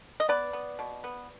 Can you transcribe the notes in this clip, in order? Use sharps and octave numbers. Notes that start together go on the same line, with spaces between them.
D#5
B3 B4 D5
B3
B2
B3